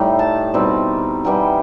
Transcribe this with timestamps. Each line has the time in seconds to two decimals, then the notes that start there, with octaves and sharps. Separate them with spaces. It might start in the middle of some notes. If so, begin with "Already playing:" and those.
Already playing: A2 G3 D#4 G5
0.19 A5
0.54 B2 G3 C4 D#4
1.24 E3 G3 B3 D#4 G5